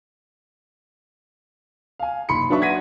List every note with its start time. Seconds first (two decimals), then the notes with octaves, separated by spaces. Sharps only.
1.99 F5 G#5
2.29 F#1 D#4 B5 C6 C#7
2.49 F#3 D4 B4 E5 C#6
2.61 F#5 G#6 A#6 B6 D#7